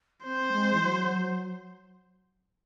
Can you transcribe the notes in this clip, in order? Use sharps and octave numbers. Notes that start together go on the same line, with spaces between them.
C4 C5
G#3
E3
F#3
F#3